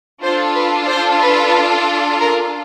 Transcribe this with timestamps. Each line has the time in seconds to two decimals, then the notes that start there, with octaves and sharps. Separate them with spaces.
0.22 D4 F4 A4 C5
0.55 B4
0.88 C5
1.21 B4
2.20 A#4